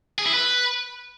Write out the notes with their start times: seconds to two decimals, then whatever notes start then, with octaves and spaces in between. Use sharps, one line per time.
0.18 G#4
0.26 E4
0.34 B4